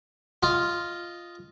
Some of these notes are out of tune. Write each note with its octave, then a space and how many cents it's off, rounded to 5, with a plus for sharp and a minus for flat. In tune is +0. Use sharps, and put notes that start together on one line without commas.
F4 -5 D#5 +0